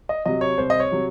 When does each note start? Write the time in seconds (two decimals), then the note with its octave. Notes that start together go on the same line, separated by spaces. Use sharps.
0.09 D#5
0.26 C3 F#3 D#5
0.41 C#5
0.58 C2 C5
0.70 D#5
0.80 C#5
0.91 C3 F#3